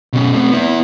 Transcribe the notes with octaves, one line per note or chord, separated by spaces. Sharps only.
B2 C#4
A3 C4
B3 E4